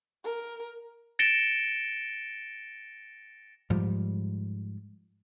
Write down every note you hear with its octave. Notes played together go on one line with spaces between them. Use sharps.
A#4
A6 A#6 C#7 D7 E7 G7
G#2 F3 G3